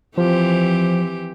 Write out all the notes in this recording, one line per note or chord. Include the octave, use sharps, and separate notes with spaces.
E3 F3 C4 G4